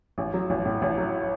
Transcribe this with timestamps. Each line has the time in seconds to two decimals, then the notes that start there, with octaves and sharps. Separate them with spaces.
0.18 A1
0.34 F#3
0.50 A1
0.65 A2
0.82 A1
0.98 F#3